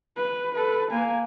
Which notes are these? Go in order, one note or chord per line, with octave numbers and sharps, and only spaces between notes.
B4
A4 B4
A#3 G#5